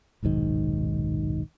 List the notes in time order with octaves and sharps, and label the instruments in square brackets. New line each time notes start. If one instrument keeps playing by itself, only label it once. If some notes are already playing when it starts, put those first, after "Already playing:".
[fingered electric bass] D#1 B1 G#2 D#3